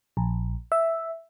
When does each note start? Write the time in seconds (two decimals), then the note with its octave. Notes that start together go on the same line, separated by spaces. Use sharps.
0.17 A#1
0.72 E5